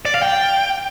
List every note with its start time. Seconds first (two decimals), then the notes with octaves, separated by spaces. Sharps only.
0.05 D5
0.14 F5
0.23 G5